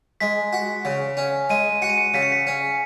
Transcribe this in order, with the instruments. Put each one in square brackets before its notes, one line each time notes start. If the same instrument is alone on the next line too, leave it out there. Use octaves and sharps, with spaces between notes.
[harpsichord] G#3 [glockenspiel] B6
[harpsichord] F#4
C#3
C#4
[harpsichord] G#3 [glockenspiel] D#7
[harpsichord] F#4 [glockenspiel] C#7
[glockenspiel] D#7
C#7
[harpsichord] C#3 [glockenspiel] B6
[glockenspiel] C#7
B6
[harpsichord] C#4